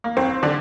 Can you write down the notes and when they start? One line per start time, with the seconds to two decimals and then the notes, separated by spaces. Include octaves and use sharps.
0.04 A#3
0.17 F#1 C4
0.43 D3 D4